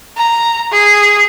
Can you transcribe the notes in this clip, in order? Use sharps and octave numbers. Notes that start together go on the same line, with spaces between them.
A#5
G#4